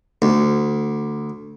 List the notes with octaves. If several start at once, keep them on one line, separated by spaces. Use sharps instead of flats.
D2